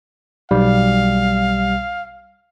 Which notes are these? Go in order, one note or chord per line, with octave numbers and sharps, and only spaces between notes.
B1 G3 F5